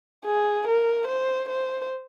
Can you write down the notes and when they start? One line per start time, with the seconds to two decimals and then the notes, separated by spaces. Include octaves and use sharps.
0.25 G#4
0.67 A#4
1.07 C5
1.49 C5